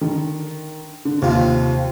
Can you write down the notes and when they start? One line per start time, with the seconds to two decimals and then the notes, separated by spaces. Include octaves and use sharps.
0.01 D3 D#3
1.05 D3
1.22 D#2 C3 F4